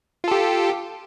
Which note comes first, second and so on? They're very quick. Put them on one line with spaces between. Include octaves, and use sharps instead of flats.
F4 A4 G4